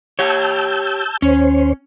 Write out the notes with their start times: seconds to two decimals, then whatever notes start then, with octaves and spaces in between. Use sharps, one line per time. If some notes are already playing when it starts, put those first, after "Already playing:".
0.19 G4 C#5 A5 E6 G6
1.22 D#2 C#4 C5 C#5